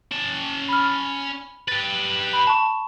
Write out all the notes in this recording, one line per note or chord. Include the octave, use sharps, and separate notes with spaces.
C#4 A5
B5 F6
G4 B4 A6
B5
A5 C#6